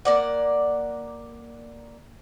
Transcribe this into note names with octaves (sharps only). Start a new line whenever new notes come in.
A#3 D5 F#5